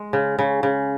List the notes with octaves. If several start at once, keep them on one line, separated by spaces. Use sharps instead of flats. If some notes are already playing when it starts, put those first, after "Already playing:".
Already playing: G#3
C#3
C#3
C#3